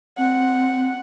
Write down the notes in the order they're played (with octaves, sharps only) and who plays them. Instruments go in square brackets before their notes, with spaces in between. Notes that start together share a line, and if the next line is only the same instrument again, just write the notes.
[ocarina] C4 [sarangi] F#5